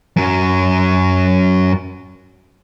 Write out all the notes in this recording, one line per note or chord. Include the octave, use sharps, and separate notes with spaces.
F#2 F#3